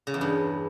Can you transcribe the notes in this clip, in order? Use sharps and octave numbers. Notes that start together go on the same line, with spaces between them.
C#3
E2
G2